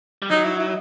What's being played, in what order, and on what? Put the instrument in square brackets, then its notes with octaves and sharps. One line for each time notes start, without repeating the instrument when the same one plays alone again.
[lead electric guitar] G3
[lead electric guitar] F#3 [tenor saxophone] D#4
[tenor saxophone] E4
E4